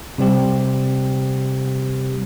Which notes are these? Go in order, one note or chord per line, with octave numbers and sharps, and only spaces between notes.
C3 G3 C4 G4